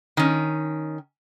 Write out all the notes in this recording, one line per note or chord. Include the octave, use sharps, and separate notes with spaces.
D#3 C#4